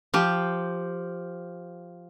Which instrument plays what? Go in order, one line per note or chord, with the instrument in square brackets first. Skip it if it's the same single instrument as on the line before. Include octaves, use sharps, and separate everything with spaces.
[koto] F3 G4